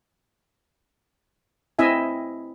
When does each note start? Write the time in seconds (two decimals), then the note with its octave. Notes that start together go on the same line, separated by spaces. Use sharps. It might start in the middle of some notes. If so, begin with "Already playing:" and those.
1.79 C4 E4 D#5 E5 G#5